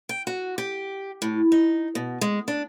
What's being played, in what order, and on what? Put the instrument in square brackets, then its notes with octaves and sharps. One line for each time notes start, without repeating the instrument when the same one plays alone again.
[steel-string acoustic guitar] G5
F#4
G4
A2
D#4
B2
G#3
D4